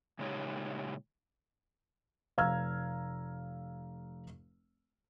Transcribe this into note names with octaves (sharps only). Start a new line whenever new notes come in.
A#2 C#3 G#3 D#4 G4 C#5
F1 F5 A#5 E6 F6 G#6